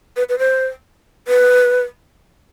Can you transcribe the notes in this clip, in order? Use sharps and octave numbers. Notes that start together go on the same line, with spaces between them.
B4
B4
C5
B4